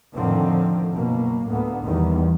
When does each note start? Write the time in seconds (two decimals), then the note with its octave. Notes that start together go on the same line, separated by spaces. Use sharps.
0.15 F2 A2 D3 D#3 F3 C4
0.92 F#1 B2 A#3
1.47 D2 A2 A#3 B3
1.83 E2 D#3 G3